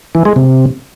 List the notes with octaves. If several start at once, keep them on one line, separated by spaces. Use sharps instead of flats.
E3
G#3
C3